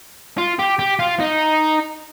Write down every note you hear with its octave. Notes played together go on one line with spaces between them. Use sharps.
F4
G4
G4
F4
D#4